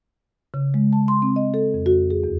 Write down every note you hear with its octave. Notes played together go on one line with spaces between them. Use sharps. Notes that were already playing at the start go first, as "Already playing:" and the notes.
C#3
G#3
A5
C6
C4
D#5
A4
F2
F#4
G#4
E2